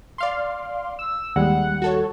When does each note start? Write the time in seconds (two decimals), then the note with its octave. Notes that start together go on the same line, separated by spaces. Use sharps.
0.18 D5 F5 C6
0.99 E6
1.36 D#2 G3 G#3 F#5
1.82 F#4 A4 C#5